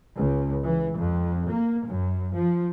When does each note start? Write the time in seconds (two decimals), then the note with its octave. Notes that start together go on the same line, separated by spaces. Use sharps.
0.16 C#2
0.65 E3
0.99 F2
1.50 A#3
1.86 F#2
2.35 F3